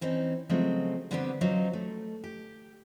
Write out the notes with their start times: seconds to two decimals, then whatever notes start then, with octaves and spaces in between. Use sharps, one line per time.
0.01 E3 C4 C#4 D#4
0.49 C#3 F3 F#3 G#3 A3 C4
1.11 D3 G3 B3 C4 E4 G4
1.41 F3 F#3 C#4 D#4 C5
1.73 A3
2.24 G4